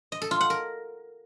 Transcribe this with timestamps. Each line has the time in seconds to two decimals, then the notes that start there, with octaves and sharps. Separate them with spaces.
0.12 D#5
0.22 A4
0.31 F4
0.41 F#5
0.50 A#4